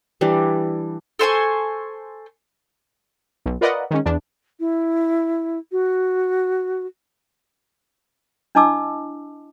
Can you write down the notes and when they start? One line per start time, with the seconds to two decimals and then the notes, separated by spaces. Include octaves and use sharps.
0.21 E3 G3 D4
1.19 A4 C5 G#5 C#6
3.46 B1
3.61 F4 A#4 B4 D5 D#5 F#5
3.91 D#3 G#3 C#4
4.05 E2 D4
4.60 E4
5.72 F#4
8.55 D4 E4 D#5 A5 D6 E6